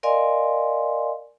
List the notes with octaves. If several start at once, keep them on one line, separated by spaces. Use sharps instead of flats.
A#4 D5 D#5 F5 G#5 C6